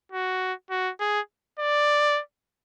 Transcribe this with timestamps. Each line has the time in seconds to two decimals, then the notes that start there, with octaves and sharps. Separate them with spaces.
0.12 F#4
0.70 F#4
1.00 G#4
1.59 D5